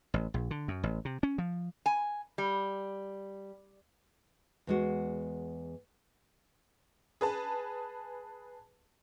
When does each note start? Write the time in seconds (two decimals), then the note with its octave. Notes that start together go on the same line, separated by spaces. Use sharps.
0.14 A1
0.34 A#1
0.51 D3
0.68 F#2
0.83 A1
1.05 C3
1.23 C#4
1.38 F3
1.86 G#5
2.38 G3
4.67 E2 G#3 F#4
7.21 G#4 B4 A5